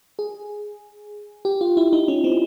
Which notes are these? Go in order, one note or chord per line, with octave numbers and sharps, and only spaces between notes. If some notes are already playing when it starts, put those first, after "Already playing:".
G#4
G4
F4
E4
D#4
C#4
C4